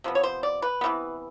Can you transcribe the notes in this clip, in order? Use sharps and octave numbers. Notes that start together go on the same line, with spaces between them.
C3 F3 B3
C#5
C5
D5
B4
C3 E3 G3 B3